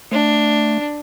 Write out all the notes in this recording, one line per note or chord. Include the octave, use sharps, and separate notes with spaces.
A3 D4